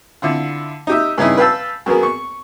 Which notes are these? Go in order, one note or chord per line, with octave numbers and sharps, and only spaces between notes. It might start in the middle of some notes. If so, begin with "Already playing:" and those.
D3 E4 F4
D#4 G4 E5
G2 C#3 D#4 E4
B4 F5 G5 A5 E6
F#2 B3 G#4 A#4
C#6